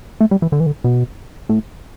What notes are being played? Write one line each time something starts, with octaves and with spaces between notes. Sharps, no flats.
A3
G3
E3
D3
E3
D3
B2
A2